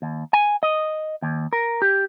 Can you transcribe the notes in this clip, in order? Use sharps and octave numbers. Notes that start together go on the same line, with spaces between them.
D#2
G#5
D#5
D#2
A#4
G4